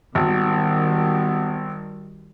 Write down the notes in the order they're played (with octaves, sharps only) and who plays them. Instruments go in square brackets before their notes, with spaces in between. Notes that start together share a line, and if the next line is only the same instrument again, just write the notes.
[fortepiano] G#1 [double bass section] D#3 G3 [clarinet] B3